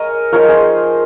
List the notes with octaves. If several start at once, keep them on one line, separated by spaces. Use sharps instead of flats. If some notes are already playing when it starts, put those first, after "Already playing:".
Already playing: G#3 A#4 C#5 D#5
F3 G#3 D#4 A#4 C#5
G#4 C5